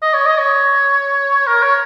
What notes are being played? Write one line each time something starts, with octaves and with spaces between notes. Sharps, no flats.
D#5
C#5
D#5
C#5
A#4
C#5